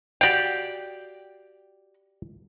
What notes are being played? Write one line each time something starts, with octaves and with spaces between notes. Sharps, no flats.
F#4 G4 D5 F5 G5